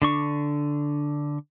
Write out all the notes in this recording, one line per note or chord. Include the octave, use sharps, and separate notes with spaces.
D3 D4 C#6